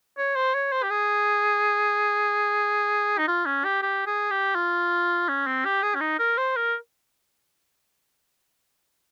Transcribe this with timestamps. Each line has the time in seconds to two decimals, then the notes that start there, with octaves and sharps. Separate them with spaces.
0.18 C#5
0.36 C5
0.55 C#5
0.72 C5
0.83 G4
0.90 G#4
3.18 D#4
3.28 F4
3.46 C#4
3.65 G4
3.82 G4
4.07 G#4
4.31 G4
4.55 F4
5.28 C#4
5.47 C4
5.65 G4
5.83 G#4
5.95 C#4
6.01 D#4
6.19 A#4
6.37 C5
6.56 A#4